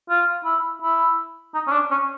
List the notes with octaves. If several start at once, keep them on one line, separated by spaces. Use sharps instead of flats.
F4
E4
E4
D#4
C#4
D4
C#4